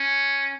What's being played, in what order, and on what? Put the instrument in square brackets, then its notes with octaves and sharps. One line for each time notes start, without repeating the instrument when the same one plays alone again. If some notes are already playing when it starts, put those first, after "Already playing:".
Already playing: [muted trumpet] C#4